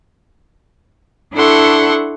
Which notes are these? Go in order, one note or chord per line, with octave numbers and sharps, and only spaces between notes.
D4 E4 A4 F#5 C6 C#6